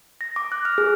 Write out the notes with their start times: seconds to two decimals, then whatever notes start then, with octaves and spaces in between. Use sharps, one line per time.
0.21 A#6
0.36 D6
0.52 F#6
0.65 F6
0.78 G#4